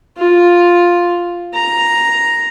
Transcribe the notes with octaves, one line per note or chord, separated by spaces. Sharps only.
F4
A#5